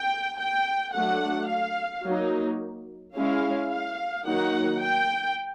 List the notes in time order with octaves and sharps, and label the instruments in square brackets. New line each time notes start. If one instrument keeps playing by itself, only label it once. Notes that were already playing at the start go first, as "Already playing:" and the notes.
Already playing: [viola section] G5
G5
F#3 A3 D4 F#5
F5
F#3 A#3 D#4
G#3 C#4 E4 F5
F5
D#3 F#3 A#3 D#4 F#5
G5